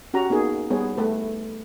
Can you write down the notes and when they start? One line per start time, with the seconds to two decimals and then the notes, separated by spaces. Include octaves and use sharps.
0.14 C#4 F#4 G4 A#5
0.30 A#3 B3 D#4 G#4
0.70 G3 B3 G#4 C#5
0.98 A3 B4